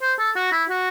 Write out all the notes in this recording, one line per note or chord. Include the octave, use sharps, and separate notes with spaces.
C5
A4
F#4
E4
F#4